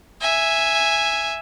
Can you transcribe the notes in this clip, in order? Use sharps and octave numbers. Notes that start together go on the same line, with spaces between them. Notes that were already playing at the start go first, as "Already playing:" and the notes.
E5 G#5